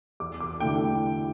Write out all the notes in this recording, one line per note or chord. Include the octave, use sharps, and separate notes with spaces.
E2 D6
D6
D3 A3 E4 G5